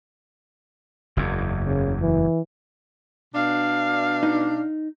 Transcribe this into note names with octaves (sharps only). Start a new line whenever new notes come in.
F#1 E2
C#3
E3
B2 D4 F5
D#4